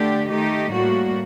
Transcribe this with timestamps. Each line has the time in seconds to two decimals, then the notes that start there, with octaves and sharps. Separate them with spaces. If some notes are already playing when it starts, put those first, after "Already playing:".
Already playing: D3 A3 D4 G4
0.30 D#3 A3 D#4 G4
0.71 A2 G3 A#3 F#4